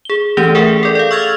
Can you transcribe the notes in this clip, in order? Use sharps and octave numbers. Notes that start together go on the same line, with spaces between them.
G#4 G7
E3 A3 C#4 G4 D5 G7
G#4 A#4 E5 F#5 G5
A4 D5
D5 F5
C#6 E6 F6 G#6 A6 F7